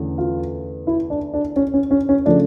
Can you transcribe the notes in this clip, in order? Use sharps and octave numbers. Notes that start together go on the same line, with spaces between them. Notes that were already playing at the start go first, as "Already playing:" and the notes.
Already playing: E2 D3 A3 C#4
F4
E4
D4
D4
C#4
C#4
C#4
C#4
C#3 F3 A3 D4